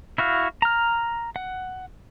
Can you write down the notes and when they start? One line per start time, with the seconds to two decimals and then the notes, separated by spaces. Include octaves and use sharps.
0.18 E4 F#4 F5
0.62 A#5 F6
1.36 F#5